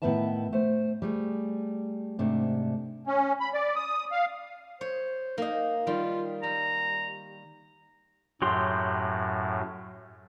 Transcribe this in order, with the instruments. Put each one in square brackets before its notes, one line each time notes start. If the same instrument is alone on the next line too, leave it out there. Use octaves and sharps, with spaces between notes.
[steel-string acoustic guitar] A2 D#3 B3 B4 E5 A5
A3 C5
G3 A3 G#4
G#2 C3 A3 D4
[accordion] C#4
B5
D5
D#6
F5
[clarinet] C5 [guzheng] C#5
[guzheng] A#3 D#5 [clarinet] D#4
[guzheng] D#3 G3 [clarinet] F4
[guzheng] G3 [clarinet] A#5
[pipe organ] F#2 A2 [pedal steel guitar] F#3 G4 C6